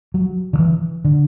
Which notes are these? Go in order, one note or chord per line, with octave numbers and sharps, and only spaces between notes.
F#3
D3
E3
D3